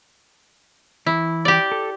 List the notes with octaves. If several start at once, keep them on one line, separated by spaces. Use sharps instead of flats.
E3 E4
G4 D5
A4